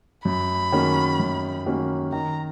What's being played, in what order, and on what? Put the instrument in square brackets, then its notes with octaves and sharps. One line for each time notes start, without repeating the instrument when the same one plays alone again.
[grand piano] F#2 [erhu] B5
[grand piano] D#3 A#3 C#4 F#4
F#2
D#3 A#3 C#4 F#4
[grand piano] D#3 [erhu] A#5